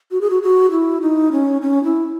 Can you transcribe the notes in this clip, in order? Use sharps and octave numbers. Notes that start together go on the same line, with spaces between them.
F#4
G#4
F#4
F#4
E4
D#4
C#4
C#4
E4